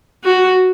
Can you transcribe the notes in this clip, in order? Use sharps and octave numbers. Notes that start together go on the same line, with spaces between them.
F#4